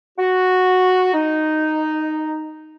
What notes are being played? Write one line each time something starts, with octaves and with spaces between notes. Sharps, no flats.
F#4
D#4